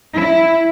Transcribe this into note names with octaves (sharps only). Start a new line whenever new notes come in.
E4